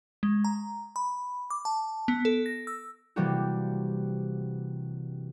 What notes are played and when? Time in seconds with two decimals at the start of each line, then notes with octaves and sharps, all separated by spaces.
0.23 G#3
0.45 A#5
0.96 B5
1.50 D6
1.65 A5
2.08 B3
2.25 A4
2.46 A#6
2.67 E6
3.16 C3 E3 G3 A#3 F#4 G4